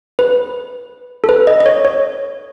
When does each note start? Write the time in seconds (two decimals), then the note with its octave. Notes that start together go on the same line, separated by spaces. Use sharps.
0.19 B4
1.24 A4
1.29 B4
1.47 D#5
1.60 D#5
1.66 C#5
1.85 C#5